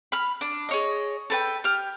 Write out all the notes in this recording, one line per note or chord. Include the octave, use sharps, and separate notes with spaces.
B5 F6
D4
G#4 C#5 D#5
A4 B4 G5
G4 F6